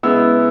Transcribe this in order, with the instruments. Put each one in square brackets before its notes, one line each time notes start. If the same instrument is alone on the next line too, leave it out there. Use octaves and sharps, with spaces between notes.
[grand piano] C#3 G#3 B3 E4 E6